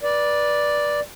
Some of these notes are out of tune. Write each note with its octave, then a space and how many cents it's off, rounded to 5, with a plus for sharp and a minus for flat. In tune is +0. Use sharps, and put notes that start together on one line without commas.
B4 -30 D5 +0